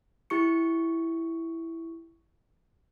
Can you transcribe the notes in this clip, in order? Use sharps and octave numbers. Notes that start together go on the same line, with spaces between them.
E4 G4 C#6 C#7